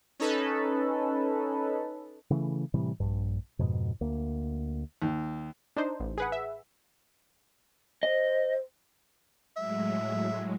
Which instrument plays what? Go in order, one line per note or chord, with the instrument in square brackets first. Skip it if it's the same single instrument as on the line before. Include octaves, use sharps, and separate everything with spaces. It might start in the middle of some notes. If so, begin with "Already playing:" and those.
[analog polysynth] C#4 D#4 A4 B4
[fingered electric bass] C#3 E3 A3
A2 C3 E3 G3
A#1 G2
F2 G#2 B2
D2 A#3
[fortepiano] D#2
[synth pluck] D4 D#4 C5
A1
G#4 B4 F#5
E5
[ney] C5 [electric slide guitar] D#5
[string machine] A2 F#3 G#3 [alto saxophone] E5